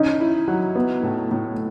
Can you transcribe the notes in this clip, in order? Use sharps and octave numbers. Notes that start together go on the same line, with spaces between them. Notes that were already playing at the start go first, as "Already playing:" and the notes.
Already playing: C#4 D#4
E4
F#3
B3
A2
A2